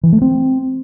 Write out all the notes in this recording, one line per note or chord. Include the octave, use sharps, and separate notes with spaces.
E3
A3
C4